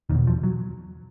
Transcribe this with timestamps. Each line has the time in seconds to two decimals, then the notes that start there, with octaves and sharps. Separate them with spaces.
0.10 E2 B2 D#3
0.27 F3
0.43 F#3